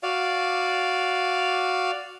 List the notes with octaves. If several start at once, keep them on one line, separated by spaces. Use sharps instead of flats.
F#4 D5 F5